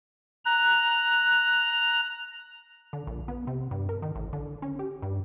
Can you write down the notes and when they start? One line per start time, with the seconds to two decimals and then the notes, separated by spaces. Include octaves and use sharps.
0.45 A#5 F#6
2.93 D3
3.07 A#1
3.28 B3
3.47 C3
3.71 G2
3.89 A#4
4.02 D#3
4.15 A1
4.33 D3
4.62 C#4
4.79 G4
5.02 G2